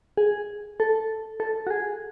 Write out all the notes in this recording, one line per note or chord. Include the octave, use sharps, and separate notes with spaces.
G#4
A4
A4
F#4
G#4